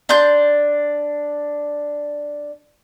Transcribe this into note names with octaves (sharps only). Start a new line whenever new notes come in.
D4 C6 G6